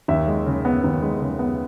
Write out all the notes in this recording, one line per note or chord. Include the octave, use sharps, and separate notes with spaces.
D#2 E5
G#3
C#3
B3
D#2
G#3
C#3
B3